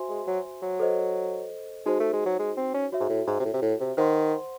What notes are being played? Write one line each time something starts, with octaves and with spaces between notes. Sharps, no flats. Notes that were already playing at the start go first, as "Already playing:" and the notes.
Already playing: F#4 C5 E5 G#5 C6
G#3
F#3
F#3
A4 C5 D#5
G#3 D#4 F#4 C5
A3
G#3
F#3
G#3
C4
C#4
F#4 C#5 E5
G#2
A2
G#2
C3
A2
C3
A2
C3
D#3 C5 F#5 C6